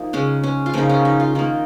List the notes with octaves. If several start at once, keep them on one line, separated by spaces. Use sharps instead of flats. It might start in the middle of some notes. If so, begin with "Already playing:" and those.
Already playing: F3 A#3 D#4
C#3 G#3 C#4
C#4
F4
C#3 F3 A#3 D#4
C#4
D#4
F4
D#3 A#3 D#4